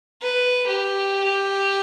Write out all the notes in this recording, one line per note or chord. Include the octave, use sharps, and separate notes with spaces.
B4
G4